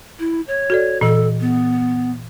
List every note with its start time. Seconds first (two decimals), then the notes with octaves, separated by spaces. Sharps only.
0.19 E4
0.47 C#5
0.70 F#4 A4 D5
1.01 A#2 E3 A4
1.41 B3